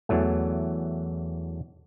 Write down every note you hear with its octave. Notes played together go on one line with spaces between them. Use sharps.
E2 E3 F#3 A3